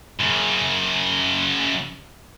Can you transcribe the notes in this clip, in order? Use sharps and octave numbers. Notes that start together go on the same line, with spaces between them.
F#2 C#3